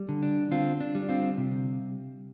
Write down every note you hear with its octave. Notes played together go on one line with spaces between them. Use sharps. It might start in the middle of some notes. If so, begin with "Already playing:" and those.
Already playing: G3
D3
D4
D3 C4 F4
D4
G3
C4 F4
C3